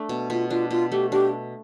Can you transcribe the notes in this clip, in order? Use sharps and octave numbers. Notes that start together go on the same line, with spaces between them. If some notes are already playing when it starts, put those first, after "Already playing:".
Already playing: A3 D4
B2
B2 F4
D4 F4
B2 F4
A3 G4
D4 G4